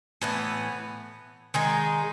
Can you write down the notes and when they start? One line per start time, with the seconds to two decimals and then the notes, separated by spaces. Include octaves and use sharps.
0.22 A2 E3 B3
1.54 D#3 G#3 D#4